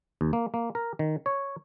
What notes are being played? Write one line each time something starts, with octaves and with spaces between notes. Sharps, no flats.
D#2
A#3
A#3
A#4
D#3
C#5